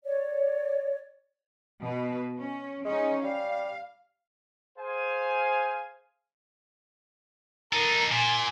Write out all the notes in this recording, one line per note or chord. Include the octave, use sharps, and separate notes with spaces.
C#5 D5
B2 B4
C#4
G#3 C#4 D#4
G3 F5
G#4 C5 F5 G#5
D#4 A4 A#4
A#2 G#5